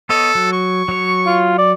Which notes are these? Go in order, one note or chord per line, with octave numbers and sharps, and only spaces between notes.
B3 A4 C#5 D#5
F#3
C#6
F#3 C#5
F4
D5